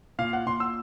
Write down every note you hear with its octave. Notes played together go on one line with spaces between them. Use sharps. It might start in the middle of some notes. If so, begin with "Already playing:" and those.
A#2 F5
F#5
A#2 C6
E6